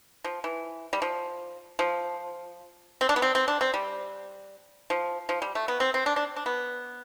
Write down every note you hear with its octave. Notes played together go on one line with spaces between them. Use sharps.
F3
E3
G3
F3
F3
C4
D4
B3
C4
C4
D4
C4
G3
F3
F3
G3
A3
B3
C4
C4
D4
D4
D4
B3